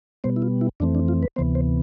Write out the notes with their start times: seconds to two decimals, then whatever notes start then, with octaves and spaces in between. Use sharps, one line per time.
0.24 B2 G3 B3 C5
0.36 E4
0.42 F4
0.61 E4
0.80 F2 E3 A3 C4 D4
0.95 D4
1.08 F4
1.23 B4
1.36 D2 C3 E3 B3 C5
1.55 C5